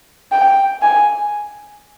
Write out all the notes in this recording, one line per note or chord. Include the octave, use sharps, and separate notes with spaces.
G5
G#5